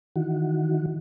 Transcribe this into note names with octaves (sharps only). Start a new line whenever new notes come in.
D#3 E3 F#4